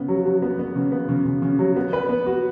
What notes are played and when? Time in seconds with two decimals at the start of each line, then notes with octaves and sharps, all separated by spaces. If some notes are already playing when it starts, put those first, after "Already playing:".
Already playing: C#3 B3
0.08 F#3
0.26 F#3
0.42 B3
0.59 B3
0.76 C#3
0.92 B3
1.09 C#3
1.26 C#3
1.42 C#3
1.59 F#3
1.76 B3
1.93 B4
2.09 B3
2.26 F#4